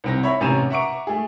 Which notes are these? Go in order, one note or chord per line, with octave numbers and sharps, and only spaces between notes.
C2 C4 A#6
C#5 E5 B5
A1 C3 C#4 A#5 D#7 E7
E5 F#5 A#5 C#6 D6 D7
A3 G#4